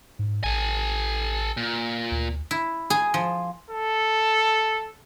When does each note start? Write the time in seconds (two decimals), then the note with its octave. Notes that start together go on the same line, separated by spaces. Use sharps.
0.19 G#2
0.44 A1 A4 G#5
1.57 A#2
2.11 D2
2.51 E4
2.90 G#4
3.14 F3
3.70 A4